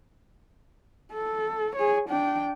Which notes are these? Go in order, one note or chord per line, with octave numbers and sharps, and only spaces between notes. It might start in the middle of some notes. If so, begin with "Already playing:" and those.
A4
G#4 C#5
D4 G5